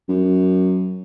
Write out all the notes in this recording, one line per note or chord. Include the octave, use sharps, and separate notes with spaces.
F#2